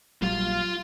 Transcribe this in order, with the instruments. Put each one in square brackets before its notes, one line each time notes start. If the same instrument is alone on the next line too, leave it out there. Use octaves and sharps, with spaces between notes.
[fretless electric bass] A#1 F#3 G3 [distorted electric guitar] F4 F5